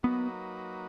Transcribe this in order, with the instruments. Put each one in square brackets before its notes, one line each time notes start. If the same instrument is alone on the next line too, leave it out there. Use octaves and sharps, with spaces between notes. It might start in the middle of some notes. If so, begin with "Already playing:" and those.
[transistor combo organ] F#3 A#3 D#4 F#4 B4 [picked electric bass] B3